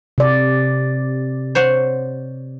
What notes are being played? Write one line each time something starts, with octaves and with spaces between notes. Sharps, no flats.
C3 D5
C5 C#5 F#5